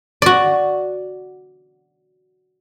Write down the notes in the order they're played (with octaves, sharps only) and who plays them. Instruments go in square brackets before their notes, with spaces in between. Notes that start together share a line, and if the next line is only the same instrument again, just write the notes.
[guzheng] F#4 D5